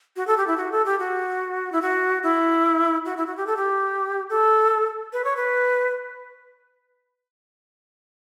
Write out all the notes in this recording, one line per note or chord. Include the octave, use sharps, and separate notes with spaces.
F#4
A4
G4
E4
F#4
A4
G4
F#4
E4
F#4
E4
F#4
E4
F#4
G4
A4
G4
A4
B4
C#5
B4